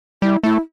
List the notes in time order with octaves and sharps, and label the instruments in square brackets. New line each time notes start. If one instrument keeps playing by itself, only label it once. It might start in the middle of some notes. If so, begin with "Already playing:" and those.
[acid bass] G3 [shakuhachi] E4
[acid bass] A3 [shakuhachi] E4